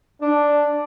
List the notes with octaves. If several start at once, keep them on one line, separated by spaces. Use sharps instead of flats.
D4